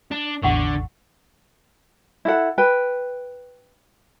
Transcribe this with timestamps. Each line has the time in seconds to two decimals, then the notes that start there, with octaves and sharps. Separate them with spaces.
0.11 D4
0.43 A1 E2 D3 G4 F#5 C#6
2.25 E4 A4 F#5
2.58 B4 G5